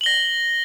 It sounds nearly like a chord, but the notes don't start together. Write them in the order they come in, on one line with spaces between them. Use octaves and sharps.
F#7 G7 A#6